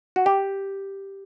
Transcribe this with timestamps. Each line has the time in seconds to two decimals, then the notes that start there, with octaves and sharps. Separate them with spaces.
0.16 F#4
0.26 G4